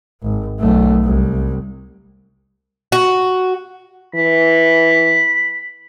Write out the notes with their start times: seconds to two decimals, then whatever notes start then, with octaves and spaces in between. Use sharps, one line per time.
0.22 G#1
0.59 B1 A3
1.04 C2
2.92 F#4
4.15 E3 B5